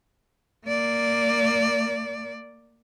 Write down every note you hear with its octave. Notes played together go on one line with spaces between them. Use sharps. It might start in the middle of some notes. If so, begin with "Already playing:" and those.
A#3 D5